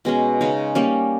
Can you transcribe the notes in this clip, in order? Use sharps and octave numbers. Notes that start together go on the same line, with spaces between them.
B2 G#3 C#4
C#3 G#3 D#4
G3 A#3 C#4